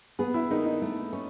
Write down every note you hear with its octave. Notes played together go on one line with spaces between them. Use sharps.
B3 G#4
E4
D#3 D#4
D#4
A3
C#4